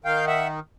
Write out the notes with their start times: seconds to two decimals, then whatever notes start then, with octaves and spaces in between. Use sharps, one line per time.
0.04 D#3 F5 G5
0.27 E5 F#5